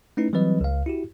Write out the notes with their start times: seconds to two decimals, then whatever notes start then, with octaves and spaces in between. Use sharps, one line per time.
0.17 A3 C#4 D#4 E4 B4
0.33 E3 F#3 G3 C4 B4 D#5
0.61 C#2 F5
0.86 E4 F#4 G4